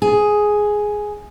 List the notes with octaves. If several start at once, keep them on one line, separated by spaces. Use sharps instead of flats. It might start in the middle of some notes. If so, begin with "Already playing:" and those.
G#4